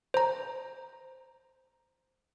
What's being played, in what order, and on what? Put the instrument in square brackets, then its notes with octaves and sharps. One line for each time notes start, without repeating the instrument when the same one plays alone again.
[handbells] C5 A#5